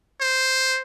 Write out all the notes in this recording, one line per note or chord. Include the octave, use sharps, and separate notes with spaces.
C5